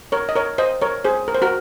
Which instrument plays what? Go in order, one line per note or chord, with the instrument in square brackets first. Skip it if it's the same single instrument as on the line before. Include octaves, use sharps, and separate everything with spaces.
[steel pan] A#4 C#5
D#5
A#4 C#5
C5 D#5
A#4 C#5
G#4 C5
A#4
C5
F#4 A#4